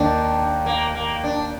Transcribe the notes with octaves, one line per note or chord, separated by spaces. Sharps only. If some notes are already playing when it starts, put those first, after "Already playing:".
Already playing: D#2 D#3 D4
A#3
A#3
D4